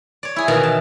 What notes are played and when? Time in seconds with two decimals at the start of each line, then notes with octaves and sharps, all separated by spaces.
0.23 C#5 D5
0.36 E4 G#4
0.48 B2 D#3 E3 A#3 G#5
0.63 A5